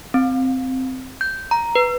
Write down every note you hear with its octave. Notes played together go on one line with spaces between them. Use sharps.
C4
G6
A#5
B4